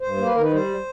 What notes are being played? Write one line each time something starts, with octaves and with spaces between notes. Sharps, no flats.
G2 C5
A#3
B4
D#3 A#4
B4
G3 C5